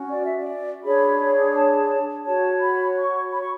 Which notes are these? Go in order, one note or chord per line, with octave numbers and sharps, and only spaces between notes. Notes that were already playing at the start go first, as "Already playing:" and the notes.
Already playing: C#4 F#4
D5
E5
D5
D4 G#4 C#5 B5
A5
F#4 C#5 A5
B5
C#6
B5
C#6